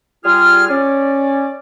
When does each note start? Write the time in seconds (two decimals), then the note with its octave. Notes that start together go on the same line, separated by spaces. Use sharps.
0.25 G3 F4 G#4 F6
0.70 C#4 D5